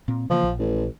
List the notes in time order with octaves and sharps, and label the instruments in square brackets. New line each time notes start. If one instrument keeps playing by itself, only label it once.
[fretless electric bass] A#2 C4
[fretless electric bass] C#3 E3 A#3 [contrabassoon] F3
[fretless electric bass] A#1
[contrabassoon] A1